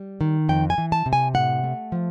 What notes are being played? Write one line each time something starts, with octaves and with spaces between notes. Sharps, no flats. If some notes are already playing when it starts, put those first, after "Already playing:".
Already playing: G3
D#3
F2 G5
G#5
E3
A5
C3
G#5
A2 F#5
A3
F3